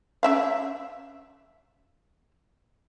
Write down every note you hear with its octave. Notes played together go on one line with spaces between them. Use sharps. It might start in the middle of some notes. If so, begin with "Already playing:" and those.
C#4 E5 F5